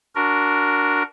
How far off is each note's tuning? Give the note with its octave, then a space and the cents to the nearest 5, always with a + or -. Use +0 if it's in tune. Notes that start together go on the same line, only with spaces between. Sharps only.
D4 -10 F#4 +0 A#4 +0